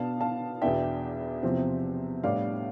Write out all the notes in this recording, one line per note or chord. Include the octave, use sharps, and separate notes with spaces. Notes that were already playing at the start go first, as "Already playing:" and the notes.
Already playing: B2 B3 D4 F5 A5
F5 A5
E2 B2 B3 D4 E5 G5
E2 C3 F3 C4
A2 G3 B3 D4 D5 F5